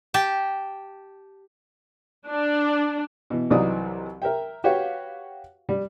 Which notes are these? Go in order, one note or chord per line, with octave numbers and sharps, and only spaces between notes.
G4 G5 A5
D4
B2 E3
C2 E3 F#3 D#4 D5 D#6
A#4 E5 G5
F#4 G4 B4 C#5 F5 G5
G3